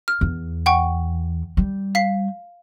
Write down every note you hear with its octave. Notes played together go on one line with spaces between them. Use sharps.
F6
E2
F#5 G5 C#6
G3
F5 B6 C7